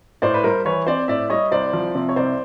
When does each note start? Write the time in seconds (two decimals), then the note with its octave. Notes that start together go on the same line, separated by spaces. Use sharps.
0.22 A2 C5 D5
0.34 B4
0.44 G3 A#4 C5
0.65 E3 B4 C#5
0.87 C4 C5 D5
1.08 A2 D5 E5
1.30 G3 C#5 D#5
1.52 C2 C5 D5
1.73 F3
1.95 C3
2.09 C#5
2.16 C2 C5 D5